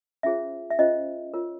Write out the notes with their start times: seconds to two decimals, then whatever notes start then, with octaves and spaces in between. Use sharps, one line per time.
0.23 C#4 F4 G#4 C5 E5
0.70 E5
0.79 C#4 F4 G#4 C5 D#5
1.34 F4 A#4 C#5